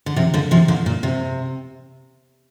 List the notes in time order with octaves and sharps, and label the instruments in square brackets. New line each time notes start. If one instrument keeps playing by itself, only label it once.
[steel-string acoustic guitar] D3
C3 F3
A#2 D3
C3 F3
A#2 D3
A#2
C3